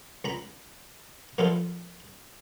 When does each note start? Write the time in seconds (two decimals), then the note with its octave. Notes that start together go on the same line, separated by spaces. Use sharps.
0.24 C#2 A#5 B5
1.38 A#2 F3 B3 E4 F4 A4